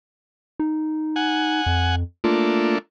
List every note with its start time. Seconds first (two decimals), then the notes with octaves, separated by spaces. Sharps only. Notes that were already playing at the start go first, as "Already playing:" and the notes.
0.59 D#4
1.16 F#5 G#5
1.66 F2
2.24 A3 A#3 D4 F4